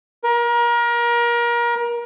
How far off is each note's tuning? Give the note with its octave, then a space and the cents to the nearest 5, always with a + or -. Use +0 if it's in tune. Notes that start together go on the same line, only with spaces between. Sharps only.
A#4 +30